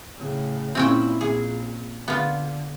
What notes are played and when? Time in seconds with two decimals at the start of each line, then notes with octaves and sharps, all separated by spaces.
0.18 A2 C#3
0.75 A#2 C4 C#4 E4 G5
1.21 A#1 G#4
2.08 D3 B3 F4